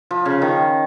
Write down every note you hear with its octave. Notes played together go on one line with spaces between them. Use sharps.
F3
C#3
D#3